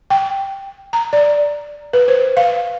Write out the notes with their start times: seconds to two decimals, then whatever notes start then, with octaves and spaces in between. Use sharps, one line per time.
0.10 G5
0.93 A#5
1.13 D5
1.93 B4
2.08 C5
2.37 F5